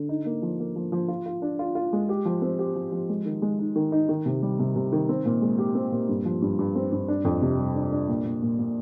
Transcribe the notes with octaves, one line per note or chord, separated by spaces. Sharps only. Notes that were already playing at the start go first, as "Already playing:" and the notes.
Already playing: D3
D#4
A#3
F3
A#3
F3
F3
F4
F4
D4
F4
F4
G#3
G4
F3
C4
G4
F3
F3
G#3
D#3
G#3
D#4
D#3
D#4
D#3
C3
G3
C3
C3
D#3
C4
A#2
G#3
G4
C4
A#2
G2
F3
G2
G2
C4
G2
D4
F2
C3
G3
D4
D4
A#2
A#2
A#2
A#2